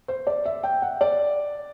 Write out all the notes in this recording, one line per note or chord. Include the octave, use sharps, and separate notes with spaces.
C5
D5
E5
G5
F#5
D5